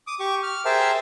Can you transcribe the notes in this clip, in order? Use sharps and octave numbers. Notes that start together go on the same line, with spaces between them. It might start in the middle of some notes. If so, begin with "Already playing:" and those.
D6 D#6
G4 C#6 D6
F6
G#4 A#4 C5 E5 G5 A5